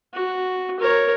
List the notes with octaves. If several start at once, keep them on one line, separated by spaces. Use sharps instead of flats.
F#4
A#4 C#5